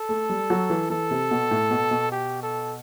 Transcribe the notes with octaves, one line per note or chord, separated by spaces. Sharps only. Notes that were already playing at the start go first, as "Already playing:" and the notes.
Already playing: A4
A3
G3
F#3
E3
E3 A4
C3
B2
A2
B2
B2
G4
A4